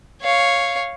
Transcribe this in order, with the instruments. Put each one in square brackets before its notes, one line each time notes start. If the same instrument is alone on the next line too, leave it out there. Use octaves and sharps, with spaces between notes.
[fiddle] C#5 F5